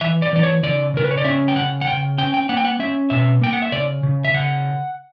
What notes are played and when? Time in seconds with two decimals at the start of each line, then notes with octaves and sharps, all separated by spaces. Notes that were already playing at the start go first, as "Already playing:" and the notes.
0.01 E3 E5
0.22 D5
0.33 E3 D5
0.43 C#5
0.63 C#3 D5
0.94 C#3 A#4
1.04 B4
1.11 C#5
1.17 D5
1.24 C#4 E5
1.48 G5
1.56 C#3 F#5
1.81 F#5
1.87 C#3 G5
2.18 C#4 G5
2.34 G5
2.49 A#3 F#5
2.57 G5
2.65 F#5
2.79 C#4 E5
3.10 B2 E5
3.42 A#3 G5
3.53 F#5
3.62 E5
3.72 C#3 D5
4.03 C#3
4.24 E5
4.34 C#3 F#5